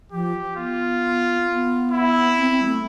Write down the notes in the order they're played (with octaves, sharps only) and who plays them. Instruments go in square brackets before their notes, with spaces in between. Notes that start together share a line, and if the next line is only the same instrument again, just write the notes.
[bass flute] F3 [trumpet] G4
[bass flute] B3 [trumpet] F4
[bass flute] B3
[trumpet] E4
[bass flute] C4
C4
G3
A3